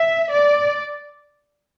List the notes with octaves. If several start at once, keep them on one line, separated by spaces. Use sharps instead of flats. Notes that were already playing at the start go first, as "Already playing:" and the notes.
Already playing: E5
D5